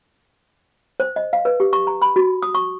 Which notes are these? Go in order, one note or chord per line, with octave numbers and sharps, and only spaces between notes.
C5
D#5
F5
B4
G4
C#6
A#5
B5
F#4
D#6
C#6